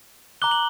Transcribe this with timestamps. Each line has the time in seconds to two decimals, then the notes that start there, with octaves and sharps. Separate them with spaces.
0.42 A#5 D6 F#6 G7
0.51 F#7